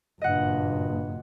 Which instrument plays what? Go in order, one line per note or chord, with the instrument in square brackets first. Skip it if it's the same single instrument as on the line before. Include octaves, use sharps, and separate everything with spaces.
[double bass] F#1 A#2 [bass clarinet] G2 [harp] D#5 F#5